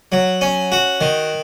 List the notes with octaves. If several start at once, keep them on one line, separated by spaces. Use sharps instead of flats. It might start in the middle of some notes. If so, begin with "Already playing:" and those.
F#3
C#4
F#4
D#3